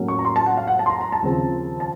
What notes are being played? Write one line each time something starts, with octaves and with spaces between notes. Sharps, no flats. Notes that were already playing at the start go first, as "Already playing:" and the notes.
Already playing: A2 F#3 A#3 C#4
C#6
A#5
C6
A5
F#5
F5
F#5
A5
C6
A#5
A#5
A5
D#2 C#3 F3 C4
A5